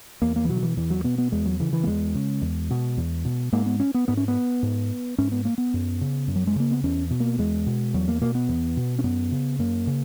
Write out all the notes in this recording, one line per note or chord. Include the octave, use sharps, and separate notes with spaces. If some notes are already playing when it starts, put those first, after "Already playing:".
E2 A#3
A#3
E3
B2 F#3
D#3
E3
E2 E3
F#3
B2 B3
B3
E2 G#3
F#3
C#3 E3
E3
A#3
E2 G#3
C#3
E2
B2
E2
B2
G#2 A#3
B3
C#4
B3
G#2 B3
C#4
B3
G#2
G#2 C#4
B3
A#3
B3
F#2
C#3
F#2
F#3
G#3
C#3 A#3
B3
E2 C#4
B2
A#3
E2 G#3
B2
E2 F#3
A#3
B2 A#3
B3
E2
B2
C#4
F#2 B3
C#3
F#2 A#3
C#3